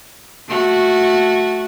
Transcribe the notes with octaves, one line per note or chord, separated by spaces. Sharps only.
A3 F#4